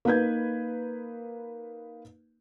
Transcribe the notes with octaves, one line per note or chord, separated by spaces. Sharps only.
A#3 D#4 B4 G6 G#6